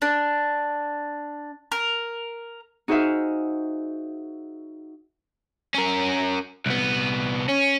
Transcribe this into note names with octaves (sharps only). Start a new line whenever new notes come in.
D4
A#4
D#4 F#4 G#4 C5 E5 F5
C#4 A#4
C2 B3
C#4